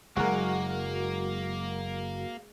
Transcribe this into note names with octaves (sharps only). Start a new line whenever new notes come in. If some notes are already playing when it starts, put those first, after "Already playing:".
F#1 F#3 G#3 A#3 F#4 A#4